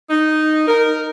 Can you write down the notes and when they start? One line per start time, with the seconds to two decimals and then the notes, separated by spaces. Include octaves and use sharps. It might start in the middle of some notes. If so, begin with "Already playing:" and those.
0.10 D#4
0.68 A#4